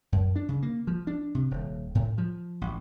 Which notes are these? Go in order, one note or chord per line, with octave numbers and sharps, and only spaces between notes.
F#2
D4
C#3
A#3
F3
D4
C3
D#1
A2
F3
A1